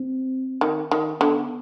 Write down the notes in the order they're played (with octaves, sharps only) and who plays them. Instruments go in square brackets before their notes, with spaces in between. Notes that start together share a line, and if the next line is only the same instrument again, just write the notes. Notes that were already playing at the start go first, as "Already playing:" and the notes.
Already playing: [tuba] C4
[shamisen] D#3
D#3
[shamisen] D3 [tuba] B3